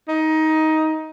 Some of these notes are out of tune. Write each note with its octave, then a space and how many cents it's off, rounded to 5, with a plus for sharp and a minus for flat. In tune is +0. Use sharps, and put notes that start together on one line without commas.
D#4 +15